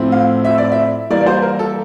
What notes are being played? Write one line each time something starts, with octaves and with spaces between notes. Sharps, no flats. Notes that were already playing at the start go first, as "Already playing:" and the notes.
Already playing: A2 F3 C4 E4
F5
E5
D5
E5
E3 G3 A#3 E4 D5
D5
C5
A#4
A4